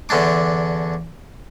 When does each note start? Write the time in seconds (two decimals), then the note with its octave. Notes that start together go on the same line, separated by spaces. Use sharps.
0.09 E2 D3 C#4 D4 D6